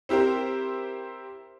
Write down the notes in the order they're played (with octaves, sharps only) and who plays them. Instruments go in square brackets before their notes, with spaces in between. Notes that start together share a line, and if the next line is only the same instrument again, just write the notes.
[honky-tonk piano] C4 E4 G4 A#4 C5